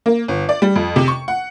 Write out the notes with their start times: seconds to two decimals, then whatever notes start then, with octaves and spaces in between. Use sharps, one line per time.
0.06 A#3
0.28 G1
0.49 D5
0.62 G3
0.76 F2
0.96 C3
1.08 C#6
1.28 F#5